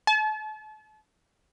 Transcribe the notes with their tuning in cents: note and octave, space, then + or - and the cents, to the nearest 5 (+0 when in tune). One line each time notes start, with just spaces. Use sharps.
A5 -40